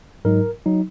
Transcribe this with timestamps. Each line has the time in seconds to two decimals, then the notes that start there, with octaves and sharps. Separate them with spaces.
0.25 G#2 F#3 D#4 A#4
0.66 F#3 D#4